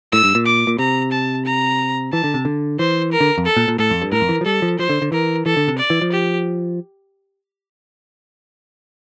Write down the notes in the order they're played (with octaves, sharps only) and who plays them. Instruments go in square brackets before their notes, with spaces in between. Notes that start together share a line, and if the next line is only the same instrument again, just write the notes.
[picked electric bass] A2 [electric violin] E6
[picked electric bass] G2
A#2
[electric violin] D6
[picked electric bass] A#2
[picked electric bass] C3 [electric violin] A#5
[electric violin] A5
A#5
[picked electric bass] E3 [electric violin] A5
[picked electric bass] D3
C3
D3
[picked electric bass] E3 [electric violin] C5
[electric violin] A#4
[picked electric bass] D3
F2
[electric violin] A4
[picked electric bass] A#2
A#2
[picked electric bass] A2 [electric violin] A4
[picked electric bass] F2
G2
[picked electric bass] A2 [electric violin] A#4
[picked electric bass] F2
E3
F3
[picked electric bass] G3 [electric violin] A4
[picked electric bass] F3
[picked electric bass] F3 [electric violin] C5
[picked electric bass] D3
D3
[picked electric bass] E3 [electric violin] A#4
[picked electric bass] E3 [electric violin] A4
[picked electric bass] D3
C3
[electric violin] D5
[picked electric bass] E3
F3
[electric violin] G4